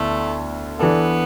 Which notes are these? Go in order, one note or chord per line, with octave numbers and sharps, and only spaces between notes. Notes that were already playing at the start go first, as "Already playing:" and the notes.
Already playing: D2 D3 A3 B3 E4
E3 B3 D4 A4